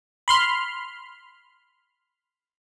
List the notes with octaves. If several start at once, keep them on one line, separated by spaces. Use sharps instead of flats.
B5 C6 F6